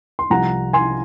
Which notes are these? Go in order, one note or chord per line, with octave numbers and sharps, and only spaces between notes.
C6
C2 C3 F3 F#5 A#5
G#5 C6